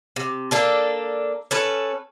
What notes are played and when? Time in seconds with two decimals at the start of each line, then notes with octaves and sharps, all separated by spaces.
0.16 C3
0.51 A#3 D4 A4
1.51 C#4 A4 B4